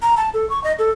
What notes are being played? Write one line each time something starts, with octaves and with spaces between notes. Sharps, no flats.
A#5
A5
A4
C#6
D#5
A4